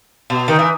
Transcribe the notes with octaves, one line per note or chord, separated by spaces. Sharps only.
B2
D#3
E3